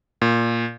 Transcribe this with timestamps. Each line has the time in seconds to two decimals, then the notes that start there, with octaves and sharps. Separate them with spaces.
0.22 A#2